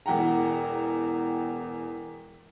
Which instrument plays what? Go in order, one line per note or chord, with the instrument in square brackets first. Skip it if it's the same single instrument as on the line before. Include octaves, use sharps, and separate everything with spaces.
[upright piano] E1 E2 F#5 G5 A#5